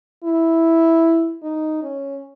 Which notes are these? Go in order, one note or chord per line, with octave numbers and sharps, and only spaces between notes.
E4
D#4
C#4